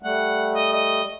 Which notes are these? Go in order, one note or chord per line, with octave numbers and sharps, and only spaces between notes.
G3 A3 F#5
D#5
D#5